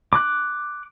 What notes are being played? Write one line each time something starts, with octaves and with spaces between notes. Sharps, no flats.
D6 F#6